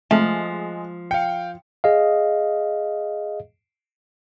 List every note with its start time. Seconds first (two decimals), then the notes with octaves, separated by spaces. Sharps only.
0.11 F3 G#3 A3
1.11 F5 G5 C#7
1.84 G#4 D#5 F5